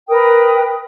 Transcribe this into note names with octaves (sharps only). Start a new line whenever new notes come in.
A#4 B4 G5 D#6